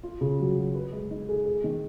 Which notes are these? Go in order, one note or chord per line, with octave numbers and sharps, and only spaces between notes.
F4
C#3
F#3
F#3
B4
G#3
D#4
G#4
G#4
D#3